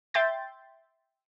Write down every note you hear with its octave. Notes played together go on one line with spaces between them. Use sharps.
E5 G5 C6 G6 A6